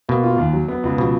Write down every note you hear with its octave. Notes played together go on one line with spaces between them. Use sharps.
B2 A#3
F4
D#2
F#3
B3
C#2
B2 F3